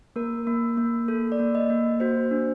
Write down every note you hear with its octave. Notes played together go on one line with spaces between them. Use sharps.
A#3 A#4
A#3
A#3
A#3 A4
D5
A#3
D#5
A#3
F#4 C5
D4